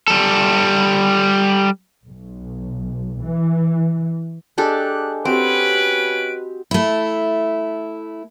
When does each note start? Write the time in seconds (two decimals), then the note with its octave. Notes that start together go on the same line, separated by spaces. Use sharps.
0.08 G3 A4
2.07 B1
3.19 E3
4.58 G#3 D4 G4 A4 D#5 F#6
5.25 C4 C#4 F#4 G4 B4 D7
6.71 A3 E4